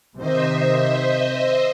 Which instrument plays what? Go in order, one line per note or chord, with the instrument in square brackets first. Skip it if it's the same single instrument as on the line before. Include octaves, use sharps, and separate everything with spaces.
[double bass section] C3 D#3 [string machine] C5 D#5 E5